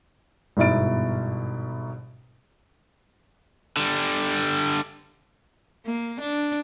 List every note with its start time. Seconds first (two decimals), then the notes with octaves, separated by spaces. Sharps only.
0.57 G1 G#2 B2 E4 A6 D7
3.77 D3 G3
5.86 A#3
6.21 D4